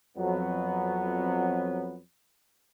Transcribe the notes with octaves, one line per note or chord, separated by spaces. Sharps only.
F2 F#3 B3